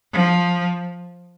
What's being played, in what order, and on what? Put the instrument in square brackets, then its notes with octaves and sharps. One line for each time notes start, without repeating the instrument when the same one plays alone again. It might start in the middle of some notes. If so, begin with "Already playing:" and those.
[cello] F3